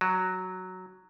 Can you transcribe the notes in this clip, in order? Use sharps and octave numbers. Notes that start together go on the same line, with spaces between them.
F#3